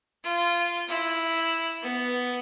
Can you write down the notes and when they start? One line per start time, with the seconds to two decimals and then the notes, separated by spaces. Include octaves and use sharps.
0.24 F4
0.89 E4
1.83 B3